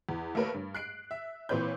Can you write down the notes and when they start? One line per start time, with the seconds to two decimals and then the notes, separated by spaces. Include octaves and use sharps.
0.09 E2
0.35 A3 A#3 G4 A#4 B4 C#5
0.54 G2
0.75 F#6 C7 D7
1.11 E5
1.49 A#2 E3 C4 B4 C#5 G6